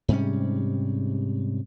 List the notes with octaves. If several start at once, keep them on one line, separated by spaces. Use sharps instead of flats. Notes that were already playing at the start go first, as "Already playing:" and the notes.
G#2 C3 G3 C#4